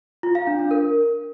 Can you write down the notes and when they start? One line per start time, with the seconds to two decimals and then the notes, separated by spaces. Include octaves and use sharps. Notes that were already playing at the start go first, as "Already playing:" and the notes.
0.23 F4
0.35 F5
0.47 D4
0.59 D4
0.71 A#4